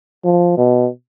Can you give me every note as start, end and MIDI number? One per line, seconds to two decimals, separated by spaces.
0.25 0.56 53
0.58 0.88 47